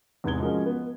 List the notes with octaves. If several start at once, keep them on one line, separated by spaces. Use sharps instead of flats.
E2 G#2 C3 B4 G#6 G7
F3 G#3 C#4 F#4 A#4
B3